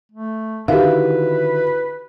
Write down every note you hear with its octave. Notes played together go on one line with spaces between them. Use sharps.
A3
D3 D#3 E4 F#4 G4 B4 E5 F5